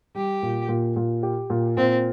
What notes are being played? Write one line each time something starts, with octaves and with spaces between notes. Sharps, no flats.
G3 G4
A#2
A#2
A#2
G4
A#2
A#2 C4